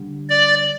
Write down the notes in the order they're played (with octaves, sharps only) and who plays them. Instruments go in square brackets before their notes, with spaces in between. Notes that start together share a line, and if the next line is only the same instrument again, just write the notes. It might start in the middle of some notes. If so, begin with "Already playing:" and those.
Already playing: [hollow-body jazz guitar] D3 G3
[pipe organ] D5